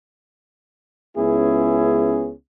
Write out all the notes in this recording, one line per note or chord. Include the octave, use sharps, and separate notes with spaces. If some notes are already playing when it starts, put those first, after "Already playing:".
C#2 B3 C#4 E4 G#4